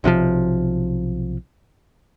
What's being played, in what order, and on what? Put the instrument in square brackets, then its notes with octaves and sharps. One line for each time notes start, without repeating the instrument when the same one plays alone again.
[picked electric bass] B1 C3 D#3 F3